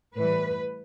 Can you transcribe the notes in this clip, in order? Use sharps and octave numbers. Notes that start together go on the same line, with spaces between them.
A2 E3 G3 B4